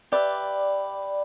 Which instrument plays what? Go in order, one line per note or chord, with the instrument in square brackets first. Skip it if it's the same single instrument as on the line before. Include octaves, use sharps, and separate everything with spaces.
[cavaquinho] G4 B4 E5 [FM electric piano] D5